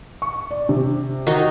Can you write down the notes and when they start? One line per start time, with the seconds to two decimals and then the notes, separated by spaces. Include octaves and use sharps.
0.22 C#6
0.51 D5
0.69 C3
1.27 D#3 D#4 F#4